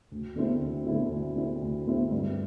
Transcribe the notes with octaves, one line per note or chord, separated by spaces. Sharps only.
D2
D3 A3 C4 E4
D2
D3 A3 C4 E4
D2
D3 A3 C4 E4
D2
D3 A3 C4 E4
G2